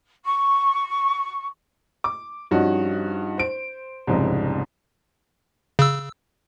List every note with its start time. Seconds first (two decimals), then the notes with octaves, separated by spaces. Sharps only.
0.24 C#6
2.04 D6
2.51 G2 F3 C#4 D#4 F#4
3.38 C5 D7
4.07 C2 F2 G#2 C#3
5.79 C#3 E6